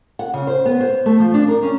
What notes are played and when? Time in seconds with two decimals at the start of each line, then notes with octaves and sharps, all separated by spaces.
0.19 F#5
0.34 C#3
0.47 C5
0.65 B3
0.80 C5
1.06 A3
1.20 F3
1.34 D4
1.48 A#4
1.63 C#4